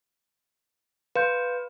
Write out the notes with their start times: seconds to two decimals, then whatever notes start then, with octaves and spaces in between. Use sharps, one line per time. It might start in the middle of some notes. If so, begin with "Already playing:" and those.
1.16 B4 F5 C6 G6